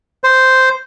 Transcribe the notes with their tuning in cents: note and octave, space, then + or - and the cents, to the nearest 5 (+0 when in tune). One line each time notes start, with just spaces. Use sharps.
C5 -5